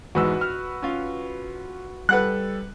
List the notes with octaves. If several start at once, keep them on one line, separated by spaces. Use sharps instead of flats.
E2 G#2 F#4 B4 E6
F6
C#4 F4
G3 A4 B4 F#5 F#6